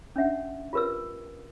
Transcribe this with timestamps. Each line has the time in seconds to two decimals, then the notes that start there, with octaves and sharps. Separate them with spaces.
0.16 C#4 D4 E5 F#5
0.73 F4 G4 A#4 B4 E6